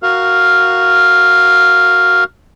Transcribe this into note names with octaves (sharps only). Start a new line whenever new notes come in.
F#4 A#4 F5